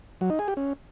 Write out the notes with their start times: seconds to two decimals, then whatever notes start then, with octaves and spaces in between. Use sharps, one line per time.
0.21 F#3
0.30 D#4
0.39 G#4
0.48 G4
0.57 C#4